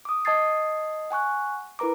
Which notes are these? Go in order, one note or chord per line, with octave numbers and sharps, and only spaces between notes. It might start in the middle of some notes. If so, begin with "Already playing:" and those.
D6 D#6
D#5 A5 D#6 G#6 A6 C7
F#5 G#5 C#6 F#6
E4 A#4 B4 A#5 D6